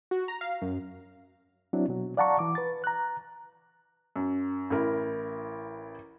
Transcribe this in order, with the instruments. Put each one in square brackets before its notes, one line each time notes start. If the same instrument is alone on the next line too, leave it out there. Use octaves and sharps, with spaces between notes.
[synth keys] F#4
A#5
F5
F#2
[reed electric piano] F#3 C4 D4 E4
B2 F#3
D5 F5 F#5 A5 A#5 C#6
E3 D6
B4 A6
A#5 F#6
[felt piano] F#2
A1 E4 A#4